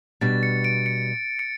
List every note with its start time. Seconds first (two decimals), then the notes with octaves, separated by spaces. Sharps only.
0.21 B2 G3 D4 A6
0.43 C#7
0.64 D7
0.86 C#7
1.39 C#7